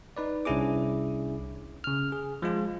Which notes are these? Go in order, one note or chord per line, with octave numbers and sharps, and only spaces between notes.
D#4 B4 D5
C2 C#4 D4 E4 G#4 D6
C#3 F6
G#4
F3 G#3 F4